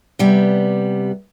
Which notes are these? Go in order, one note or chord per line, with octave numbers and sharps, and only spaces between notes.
C3 G3 B3